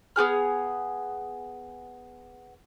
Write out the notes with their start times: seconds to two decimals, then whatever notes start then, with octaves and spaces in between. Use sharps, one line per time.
0.16 B3 F#4 G#4 F6